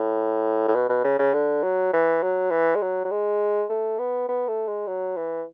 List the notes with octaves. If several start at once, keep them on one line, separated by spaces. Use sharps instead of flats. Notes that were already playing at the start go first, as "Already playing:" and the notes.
Already playing: A2
A2
B2
B2
C#3
C#3
D3
F#3
E3
F#3
E3
G#3
F#3
F#3
G#3
A3
B3
B3
A3
G#3
F#3
E3